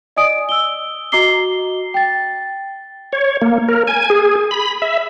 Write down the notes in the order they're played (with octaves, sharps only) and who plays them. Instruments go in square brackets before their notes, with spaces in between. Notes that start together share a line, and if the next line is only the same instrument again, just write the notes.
[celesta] D5 D#5 G#5 D#6 D7
E6 G7
F#4 D#5 A#5 D6 C7 G7
G5 A6
[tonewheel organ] C#5
A#3
A#4
G#5
G#4
B5
E5